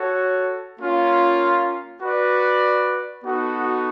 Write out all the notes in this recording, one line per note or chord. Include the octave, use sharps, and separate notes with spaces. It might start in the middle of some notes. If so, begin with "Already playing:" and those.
Already playing: F#4 A4 C#5
A#3 C#4 F4
F#4 B4 D5
B3 D#4 F#4 A4